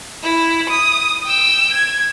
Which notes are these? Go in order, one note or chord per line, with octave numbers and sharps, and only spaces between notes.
E4
D#6
G5 E6
G#6